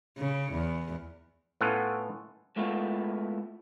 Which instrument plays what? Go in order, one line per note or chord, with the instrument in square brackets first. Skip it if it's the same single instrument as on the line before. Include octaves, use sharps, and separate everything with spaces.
[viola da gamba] C#3
E2
[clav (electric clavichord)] A2 B3 C#4 F4 A4 F#5
[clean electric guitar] G#3 A3 B3 E4 F4